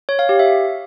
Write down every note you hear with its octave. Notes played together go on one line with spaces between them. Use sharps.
C#5
F5
G4
E5